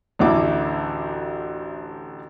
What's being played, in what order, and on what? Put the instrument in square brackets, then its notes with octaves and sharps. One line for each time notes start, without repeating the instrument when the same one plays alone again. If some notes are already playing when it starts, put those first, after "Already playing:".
[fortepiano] A1 D2 E4 D6